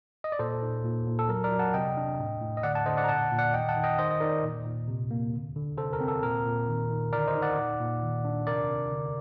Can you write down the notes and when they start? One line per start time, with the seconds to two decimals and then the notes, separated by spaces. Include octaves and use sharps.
0.24 D#5
0.32 D5
0.39 A#2 A4 C5
0.62 D#4
0.85 A#2
1.07 A#2
1.19 A4
1.29 F#3 A#4
1.44 A#4 D5
1.52 F#3
1.59 F#5 A5
1.74 C3 D#5 G5
1.97 D4
2.19 A2
2.41 A2
2.57 D#5
2.63 D3 D5 F#5
2.75 F#5 A5
2.86 D3 C5 D#5
2.97 D5 F#5
3.04 A#5
3.09 A#2 F#5 A5
3.31 A#2
3.39 D5 F#5
3.53 D#3 D#5 G5
3.69 F#5 A5
3.76 D#3
3.83 D#5 G5
3.98 D#3 C5 D#5
4.11 D#5
4.20 D#3 A#4 D5
4.43 A#2
4.65 A#2
4.88 C3
5.11 A#3
5.34 D3
5.56 D3
5.78 C3 A4 C5
5.93 A#4
6.01 C4
6.08 A4
6.23 A#2 A#4
6.46 A#2
6.68 D#3
6.90 D#3
7.12 D3 A#4 D5
7.27 C5 D#5
7.35 D#4
7.42 D5 F#5
7.57 A#2
7.80 A#2
8.02 D#3
8.25 D4
8.47 C3 A#4 D5
8.69 C3
8.92 D3